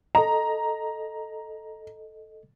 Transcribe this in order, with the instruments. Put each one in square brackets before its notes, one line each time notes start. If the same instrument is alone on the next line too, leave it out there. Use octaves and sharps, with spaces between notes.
[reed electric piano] A4 D#5 [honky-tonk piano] A#5